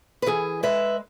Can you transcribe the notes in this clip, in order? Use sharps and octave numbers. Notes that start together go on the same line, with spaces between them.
B4
E3 G#4
G#3 B4 E5